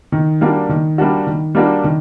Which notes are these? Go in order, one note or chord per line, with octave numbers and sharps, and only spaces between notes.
D#3
G3 A#3 D4 F#4
D#3
G3 A#3 D4 F#4
D#3
G3 A#3 D4 F#4
D#3